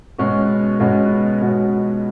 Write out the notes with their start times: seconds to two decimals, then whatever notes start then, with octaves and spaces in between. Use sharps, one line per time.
0.18 B2 G#3 C#4 F#4
0.79 B2 G#3 C#4 F#4
1.41 B2 G#3 C#4 F#4